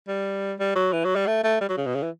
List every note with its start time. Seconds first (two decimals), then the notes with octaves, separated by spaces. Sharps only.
0.08 G3
0.60 G3
0.76 F#3
0.93 E3
1.05 F#3
1.16 G3
1.27 A3
1.44 A3
1.61 G3
1.69 F#3
1.78 C#3
1.86 B2
1.95 C#3
2.03 E3